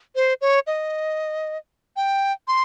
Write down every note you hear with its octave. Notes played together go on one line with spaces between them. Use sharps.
C5
C#5
D#5
G5
C6